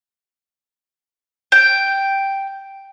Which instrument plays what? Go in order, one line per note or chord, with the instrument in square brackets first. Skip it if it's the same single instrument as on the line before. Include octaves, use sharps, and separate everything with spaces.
[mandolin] G5